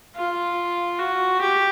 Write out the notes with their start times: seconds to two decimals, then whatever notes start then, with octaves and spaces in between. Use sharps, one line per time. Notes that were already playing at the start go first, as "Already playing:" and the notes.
0.15 F4
0.99 F#4
1.41 G4